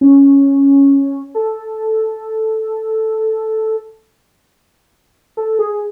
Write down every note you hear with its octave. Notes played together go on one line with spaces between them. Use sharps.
C#4
A4
A4
G#4